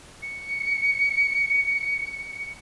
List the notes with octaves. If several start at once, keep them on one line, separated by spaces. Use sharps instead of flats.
C#7